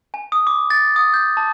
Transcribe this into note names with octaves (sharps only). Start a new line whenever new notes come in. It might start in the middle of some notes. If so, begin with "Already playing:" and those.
G#5
D#6
D6
A6
D#6
G6
A5